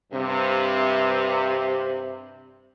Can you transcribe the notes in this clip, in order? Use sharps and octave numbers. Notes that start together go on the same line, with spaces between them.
G2 C3